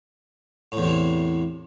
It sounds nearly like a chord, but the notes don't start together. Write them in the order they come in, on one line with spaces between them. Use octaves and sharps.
A2 E2 C3 E3